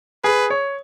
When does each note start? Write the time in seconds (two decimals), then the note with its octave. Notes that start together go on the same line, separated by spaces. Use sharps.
0.24 G#4 B4
0.50 C#5